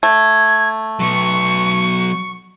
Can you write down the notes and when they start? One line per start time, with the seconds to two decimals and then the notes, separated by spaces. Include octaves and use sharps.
0.03 A3 G#6
1.00 F#3 B3 C#6